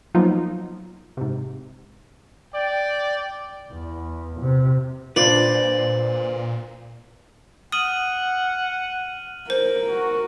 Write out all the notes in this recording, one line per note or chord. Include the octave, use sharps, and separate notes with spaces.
F3 F#3 A#3 B3 D#4 F4
G#2 C3
D5 G5
E2
C3
A#2 D4 F4 B4 C5 D5
F#5 D#6 F6 D#7 F#7
A#4 C5
F#4